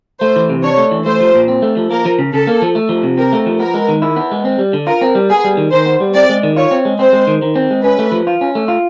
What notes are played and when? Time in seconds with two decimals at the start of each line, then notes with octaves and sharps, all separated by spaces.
0.21 A3 C5
0.36 E3
0.50 C3
0.63 D4 C#5
0.77 A3
0.91 E3
1.06 A3 C5
1.20 F3
1.35 A#2
1.48 C4
1.62 A3
1.77 F3
1.91 A#3 A#4
2.05 F3
2.19 C#3
2.33 C#3 A4
2.47 A#3
2.62 F3
2.75 A3
2.89 F3
3.03 C3
3.18 C4 A#4
3.33 A3
3.46 F3
3.60 B3 A#4
3.74 G#3
3.88 D#3
4.02 E4
4.16 B3
4.31 G#3
4.45 C4
4.59 G3
4.73 D3
4.87 F4 A#4
5.02 C4
5.15 G3
5.30 B3 G#4
5.44 G3
5.57 D#3
5.72 D#3 C5
5.86 B3
6.00 G3
6.15 C4 D5
6.29 G#3
6.43 D#3
6.56 F4 C#5
6.71 C4
6.85 G#3
6.99 C4 C5
7.13 G#3
7.27 D#3
7.42 D#3
7.56 C4
7.71 G#3
7.84 C#4 B4
7.99 A3
8.12 F3
8.27 F4
8.41 C#4
8.55 A3
8.68 F4